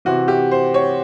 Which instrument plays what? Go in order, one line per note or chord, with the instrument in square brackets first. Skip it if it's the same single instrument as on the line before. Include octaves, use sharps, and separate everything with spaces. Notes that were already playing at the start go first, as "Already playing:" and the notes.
[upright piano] C3 E3 F#4
G4
C5
C#5